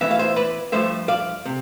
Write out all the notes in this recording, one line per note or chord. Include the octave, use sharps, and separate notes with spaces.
A2 E3 B3 E5
F5
C5 E5
B4 D5
G2 F3 A3 C5 E5
D5 F5
C3